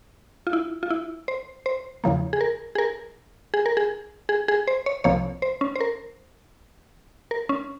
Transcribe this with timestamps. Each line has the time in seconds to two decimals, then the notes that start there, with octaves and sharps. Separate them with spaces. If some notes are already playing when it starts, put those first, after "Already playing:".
0.47 F4
0.53 E4
0.83 F4
0.90 E4
1.28 C5
1.66 C5
2.04 E2 C#3 F3 A#3
2.33 G#4
2.41 A#4
2.75 G#4
2.78 A#4
3.54 G#4
3.66 A#4
3.77 G#4
4.29 G#4
4.48 G#4
4.67 C5
4.86 C#5
5.04 C2 C3 F3 A#3 C#5
5.42 C5
5.61 C#4
5.76 C5
5.81 A#4
7.31 A#4
7.49 C#4